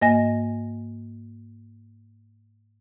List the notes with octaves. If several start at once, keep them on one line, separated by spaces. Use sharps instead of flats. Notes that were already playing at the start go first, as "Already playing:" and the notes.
G#2 A#3 D#5 G#5 A#6